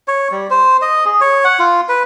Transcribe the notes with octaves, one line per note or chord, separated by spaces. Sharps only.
C#5
G3
C5
D#5
G#4
C#5
F#5
F4
B4